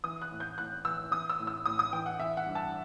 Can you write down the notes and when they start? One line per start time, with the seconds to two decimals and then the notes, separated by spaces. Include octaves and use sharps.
0.04 E3 D#6
0.21 F#6
0.31 A2
0.40 G6
0.58 A2 F#6
0.85 E3 E6
1.11 E3 D#6
1.30 E6
1.39 A2
1.47 E6
1.66 A2 D#6
1.79 D#6
1.93 E3 G5
2.06 F#5
2.19 E3 E5
2.37 F#5
2.46 G2
2.55 A5